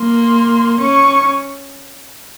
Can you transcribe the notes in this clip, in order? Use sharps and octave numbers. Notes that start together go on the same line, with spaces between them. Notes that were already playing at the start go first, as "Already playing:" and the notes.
Already playing: A#3 C6
C#4 C#6